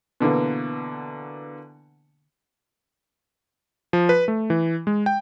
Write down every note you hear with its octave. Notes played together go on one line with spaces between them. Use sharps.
B2 D3 E3 A#3
F3
B4
A3
E3
G#3
G5